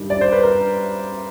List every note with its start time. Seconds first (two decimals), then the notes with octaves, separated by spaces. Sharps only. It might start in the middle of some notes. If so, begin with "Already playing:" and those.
Already playing: G2 D#3 G3
0.10 D5
0.21 C5
0.32 B4
0.43 A#4